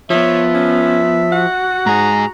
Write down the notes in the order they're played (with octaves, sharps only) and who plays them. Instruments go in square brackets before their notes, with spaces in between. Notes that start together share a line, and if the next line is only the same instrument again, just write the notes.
[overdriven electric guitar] F3 [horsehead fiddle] B3 [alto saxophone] C#5 [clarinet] E5
[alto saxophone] C#4
[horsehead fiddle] F#4 [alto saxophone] F#5
[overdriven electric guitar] G#2 G#4 [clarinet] A#5